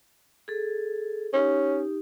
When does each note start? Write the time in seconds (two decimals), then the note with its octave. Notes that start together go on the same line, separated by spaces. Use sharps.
0.48 G#4 A4
1.33 C#4 D#4 G4